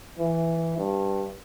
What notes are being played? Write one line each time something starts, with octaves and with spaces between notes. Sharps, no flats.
E3
G2